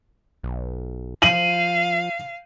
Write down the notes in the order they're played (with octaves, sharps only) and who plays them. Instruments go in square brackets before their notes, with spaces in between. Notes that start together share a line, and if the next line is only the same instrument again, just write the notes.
[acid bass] B1
[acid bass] F3 [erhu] F5 [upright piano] D#7 F#7